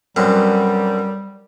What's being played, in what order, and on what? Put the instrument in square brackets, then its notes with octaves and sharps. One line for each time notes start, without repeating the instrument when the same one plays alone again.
[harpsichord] B1 F#2 C4 [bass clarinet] G3